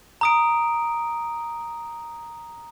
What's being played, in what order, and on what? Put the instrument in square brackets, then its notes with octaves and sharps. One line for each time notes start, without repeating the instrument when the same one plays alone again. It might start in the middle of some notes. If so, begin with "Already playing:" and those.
[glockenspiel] A#5 D#6 D7